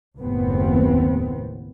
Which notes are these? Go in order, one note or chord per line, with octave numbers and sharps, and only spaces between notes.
F#1 D#2 A2 B3 C4